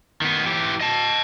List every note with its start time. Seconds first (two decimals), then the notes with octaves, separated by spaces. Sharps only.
0.22 D#3 B3
0.46 E3 G4
0.81 D#5 A5